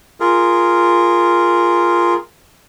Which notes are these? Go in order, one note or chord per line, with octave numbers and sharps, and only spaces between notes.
F4 G#4 A#4